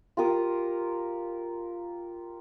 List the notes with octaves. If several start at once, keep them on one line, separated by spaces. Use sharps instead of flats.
F4 G4 A#4 D#6